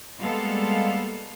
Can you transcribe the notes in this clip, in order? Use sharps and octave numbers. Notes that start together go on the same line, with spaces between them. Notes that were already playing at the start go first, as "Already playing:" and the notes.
G3 G#3 A#3 B3 A4 F5